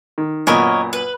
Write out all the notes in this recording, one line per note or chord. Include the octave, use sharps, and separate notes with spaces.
D#3
F#2 A#2 B3 A#4 C#5 D#5
B4